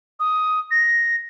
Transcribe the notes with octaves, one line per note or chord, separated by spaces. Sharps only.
D#6
A#6